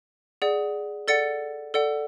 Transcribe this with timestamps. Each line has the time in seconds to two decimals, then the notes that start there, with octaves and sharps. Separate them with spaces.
0.42 G#4 D5 F#5
1.08 A4 D5 F#5 A6 C#7
1.74 A4 D5 F#5